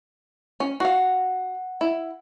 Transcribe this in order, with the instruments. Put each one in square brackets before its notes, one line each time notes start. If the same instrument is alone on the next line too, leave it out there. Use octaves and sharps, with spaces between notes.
[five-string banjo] C#4
[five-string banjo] F#4 F5 [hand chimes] F#5
[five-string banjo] E4